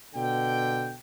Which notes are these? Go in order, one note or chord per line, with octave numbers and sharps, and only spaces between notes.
B2 D3 G5